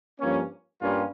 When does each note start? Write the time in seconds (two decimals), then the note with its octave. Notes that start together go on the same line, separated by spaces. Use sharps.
0.19 G2 F3 A#3 C#4
0.81 G2 G3 A#3 C#4 F4